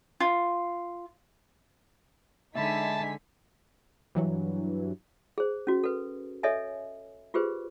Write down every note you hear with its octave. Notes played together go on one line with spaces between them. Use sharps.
F4
D3 G#3 D#4 E5 G#5 A5 B5 B6
G2 E3 F#3
G#4 C5
C#4 F#4
A4 B4
A4 C#5 D#5 E5 G#5
F4 G4 G#4 B4 C5